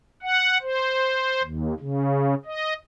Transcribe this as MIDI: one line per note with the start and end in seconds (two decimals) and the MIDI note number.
0.22 0.58 78
0.62 1.42 72
1.43 1.74 39
1.80 2.35 49
2.46 2.74 75